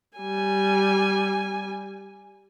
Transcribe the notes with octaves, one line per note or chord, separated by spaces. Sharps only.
G3 G#5